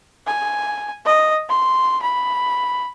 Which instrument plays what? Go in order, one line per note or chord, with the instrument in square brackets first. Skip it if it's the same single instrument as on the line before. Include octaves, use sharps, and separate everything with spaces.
[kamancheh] G#5
D#5
C6
B5